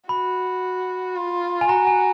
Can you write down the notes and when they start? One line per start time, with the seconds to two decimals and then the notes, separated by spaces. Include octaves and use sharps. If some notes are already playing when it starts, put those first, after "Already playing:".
0.09 F#4 B5
1.16 F4
1.61 G#5
1.69 F#4 A#5
1.87 G#5